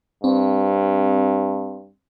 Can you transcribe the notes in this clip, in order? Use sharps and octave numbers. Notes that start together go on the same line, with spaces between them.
G2 C4